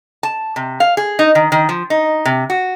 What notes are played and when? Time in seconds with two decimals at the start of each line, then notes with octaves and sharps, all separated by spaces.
0.23 A5
0.56 C3
0.80 F5
0.97 G#4
1.19 D#4
1.35 D#3
1.52 D#3
1.69 F3
1.90 D#4
2.25 C3
2.50 F#4